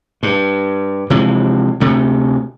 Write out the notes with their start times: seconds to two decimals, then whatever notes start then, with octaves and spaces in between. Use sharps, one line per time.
0.23 G2
1.10 C3 E3 F3 G#3
1.80 D2 C3 A3